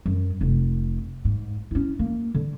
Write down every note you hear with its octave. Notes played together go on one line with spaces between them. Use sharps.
F#2
F1
G#2
C#4 E4
A#3
D3